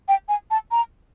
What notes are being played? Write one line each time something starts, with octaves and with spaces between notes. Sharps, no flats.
G5
G#5
A5
A#5